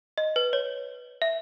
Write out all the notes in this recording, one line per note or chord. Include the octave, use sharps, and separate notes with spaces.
D#5
B4
C#5
E5